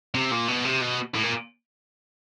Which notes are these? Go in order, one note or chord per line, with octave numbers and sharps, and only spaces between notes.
C3
A#2
B2
C3
B2
A2
A#2